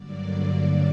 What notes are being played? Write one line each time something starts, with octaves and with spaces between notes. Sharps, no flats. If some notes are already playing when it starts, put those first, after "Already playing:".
Already playing: G2 D3 F#3 A#3 D5